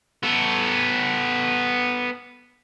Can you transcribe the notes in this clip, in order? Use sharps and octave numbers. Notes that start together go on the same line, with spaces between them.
B3 A4